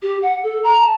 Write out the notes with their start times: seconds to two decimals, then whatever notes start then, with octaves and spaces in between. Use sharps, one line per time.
0.02 G4
0.22 F#5
0.43 A4
0.63 A#5
0.80 A5